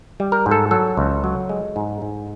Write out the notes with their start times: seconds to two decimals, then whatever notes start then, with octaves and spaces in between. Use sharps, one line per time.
0.20 G3
0.32 A#4
0.46 G#2
0.51 A4
0.71 F#3 A4
0.97 C#2
1.24 F#3
1.49 G#3
1.76 G#2
2.02 G#2